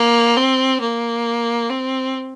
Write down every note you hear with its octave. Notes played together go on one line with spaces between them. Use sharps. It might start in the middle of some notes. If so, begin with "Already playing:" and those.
Already playing: A#3
C4
A#3
C4